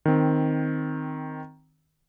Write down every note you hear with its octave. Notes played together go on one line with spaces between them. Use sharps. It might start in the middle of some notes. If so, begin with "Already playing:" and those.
D#3 C4